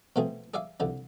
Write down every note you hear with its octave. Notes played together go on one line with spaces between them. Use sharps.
B2 F3 A3 C4 G#4
G#4 D5 E5 F5 D6
C2 D3 F3